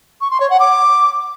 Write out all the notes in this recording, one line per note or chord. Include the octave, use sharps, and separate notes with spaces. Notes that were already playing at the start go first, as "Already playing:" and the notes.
C#6
C6
C#5
F#5
D6